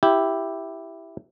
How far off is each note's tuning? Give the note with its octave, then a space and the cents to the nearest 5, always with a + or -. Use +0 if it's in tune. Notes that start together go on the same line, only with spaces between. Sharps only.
E4 +0 G4 +0